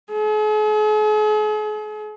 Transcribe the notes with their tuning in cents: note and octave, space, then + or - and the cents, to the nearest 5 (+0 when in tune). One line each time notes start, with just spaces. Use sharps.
G#4 +45